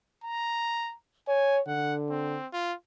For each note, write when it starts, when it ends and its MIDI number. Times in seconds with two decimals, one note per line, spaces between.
0.24 0.95 82
1.28 1.60 73
1.28 1.58 80
1.67 2.38 50
1.67 1.95 78
2.10 2.46 60
2.53 2.73 65